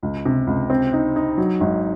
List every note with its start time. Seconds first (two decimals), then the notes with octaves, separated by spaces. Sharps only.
0.03 C#2
0.25 C3
0.47 C#2
0.70 C4
0.93 D#4
1.16 D#4
1.38 F#3
1.61 G#1